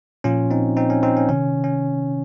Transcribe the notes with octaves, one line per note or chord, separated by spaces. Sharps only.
A#2 F3 C#4 F4
C4 D#4
C4 D#4
C#4
C4 D#4
C#4
C3 D#3 C#4
C#4